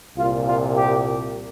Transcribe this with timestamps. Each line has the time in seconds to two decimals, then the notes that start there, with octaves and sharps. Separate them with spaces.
0.18 C2 F4
0.22 A#2
0.47 F4
0.76 G4